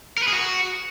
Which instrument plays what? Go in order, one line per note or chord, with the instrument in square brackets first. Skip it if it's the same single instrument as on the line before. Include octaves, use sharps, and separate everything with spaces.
[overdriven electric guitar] A#4
B4
G#4
F#4